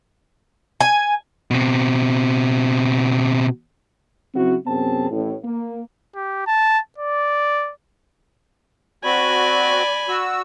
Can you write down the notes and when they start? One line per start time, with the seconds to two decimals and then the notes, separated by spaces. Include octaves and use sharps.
0.81 G#5
1.51 B2 C4
4.35 C#3 F#3 C4 E4 F#4
4.66 F#2 C3 B3 C4 G#4 A5
5.10 A1 A2
5.44 A#3
6.15 G4
6.47 A5
6.98 D5
9.04 C4 F#4 D5 G#5 B5
10.09 F#4 E6